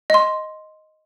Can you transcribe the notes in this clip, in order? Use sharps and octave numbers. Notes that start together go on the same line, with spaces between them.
D#5 C6